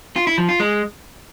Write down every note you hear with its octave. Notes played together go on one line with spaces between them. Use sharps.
F4
E4
F3
F4
G#3